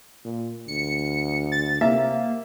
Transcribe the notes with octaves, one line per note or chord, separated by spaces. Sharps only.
A#2
D2 C#7
A6
C3 A#3 E5